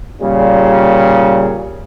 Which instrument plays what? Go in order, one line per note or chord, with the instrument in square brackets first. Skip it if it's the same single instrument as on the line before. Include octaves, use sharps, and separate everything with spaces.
[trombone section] A#2 C#3 G3